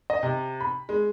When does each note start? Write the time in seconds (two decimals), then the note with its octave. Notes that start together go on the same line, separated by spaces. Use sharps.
0.10 D#5
0.23 C3
0.60 B5
0.89 G#3